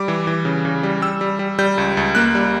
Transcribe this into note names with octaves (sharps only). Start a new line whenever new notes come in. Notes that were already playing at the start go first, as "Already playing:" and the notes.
Already playing: G3 D6
E3
E3
C#3
C#3
G3
G3 E6
G3
G3
G3 G6
C#2
C#2
A#3 F#6
G3